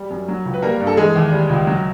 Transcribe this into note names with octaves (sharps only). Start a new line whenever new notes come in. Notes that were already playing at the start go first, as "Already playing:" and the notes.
Already playing: G3
F#2
F#3
C#2
B4
G3 A#3 A#4
G2
A4
E3 G#3 G#4
D#2
G3
C#2
F#3